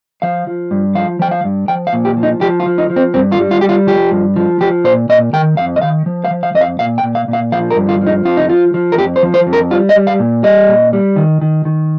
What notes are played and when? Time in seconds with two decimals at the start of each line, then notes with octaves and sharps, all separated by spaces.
0.22 F3 F5
0.47 F3
0.71 G2
0.95 F3 F5
1.19 F3 G5
1.31 F5
1.44 G2
1.68 F3 G5
1.87 F5
1.93 A#2
2.05 G4
2.17 F3
2.23 D#4
2.41 F3 G4
2.60 F4
2.66 F3
2.78 D#4
2.90 F3
2.96 C4
3.14 G2 C4
3.32 F4
3.39 G3
3.51 F4
3.61 G3 G4
3.69 F4
3.87 F3 G4
4.11 G2
4.36 F3
4.61 F3 G4
4.84 A#2 C5
5.09 A#2 D#5
5.33 D#3 G5
5.57 F2 F5
5.76 D#5
5.82 D#3 F5
6.06 F3
6.24 F5
6.31 F3
6.43 F5
6.55 F2 D#5
6.61 F5
6.79 A#2 F5
6.98 G5
7.03 A#2
7.15 F5
7.28 A#2
7.33 F5
7.52 F3 F5
7.71 A#4
7.76 G2
7.89 F4
8.01 F3
8.07 D#4
8.25 F2 F4
8.37 D#4
8.49 F3 F4
8.74 F3
8.92 A#4
8.98 F2 G4
9.16 C5
9.23 F3
9.34 C5
9.47 F2
9.53 A#4
9.71 G3 F4
9.89 D#5
9.96 G3
10.07 F5
10.20 A#2
10.43 G3 D#5
10.68 A#2
10.93 G3
11.16 D#3
11.42 D#3
11.65 D#3